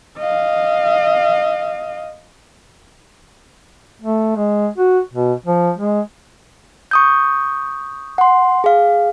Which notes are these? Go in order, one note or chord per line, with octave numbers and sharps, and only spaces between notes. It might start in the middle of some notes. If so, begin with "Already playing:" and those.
D#5 F5
A3
G#3
F#4
B2
F3
G#3
C#6 D#6 G6
F#5 C6
G#4 F5